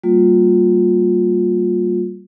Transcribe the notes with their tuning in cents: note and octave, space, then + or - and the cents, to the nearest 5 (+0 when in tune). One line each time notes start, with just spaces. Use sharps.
G3 -25 A#3 -25 F4 +25